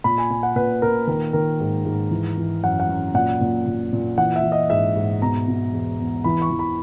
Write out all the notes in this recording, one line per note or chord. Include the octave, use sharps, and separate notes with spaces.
A#2 B5
G#5
A#2 G#5
F#5
A#2 B4
A#2 A#4
D#3 A#4
D#3 A#4
G#2
G#2
E3
E3
F#2 F#5
F#5
F#2
A#2 F#5
A#2
A#2
A#2
E3 F#5
E5
E3
D#5
G#2 E5
G#2
B2 A#5
B2
E2
E2
E3 B5
C#6
E3
B5